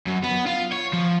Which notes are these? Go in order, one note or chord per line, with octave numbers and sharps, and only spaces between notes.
F#2
B3
F4
C#5
F3